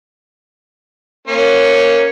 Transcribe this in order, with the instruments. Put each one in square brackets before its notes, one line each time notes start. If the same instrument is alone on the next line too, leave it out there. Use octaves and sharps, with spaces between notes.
[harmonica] A#3 C#4 C#5